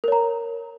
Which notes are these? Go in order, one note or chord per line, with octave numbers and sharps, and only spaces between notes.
A#4 C#5 A#5